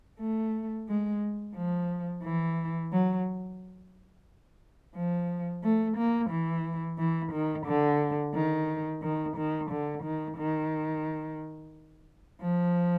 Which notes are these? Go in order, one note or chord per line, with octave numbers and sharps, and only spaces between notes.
A3
G#3
F3
E3
F#3
F3
A3
A#3
E3
E3
D#3
D3
D#3
D#3
D#3
D3
D#3
D#3
F3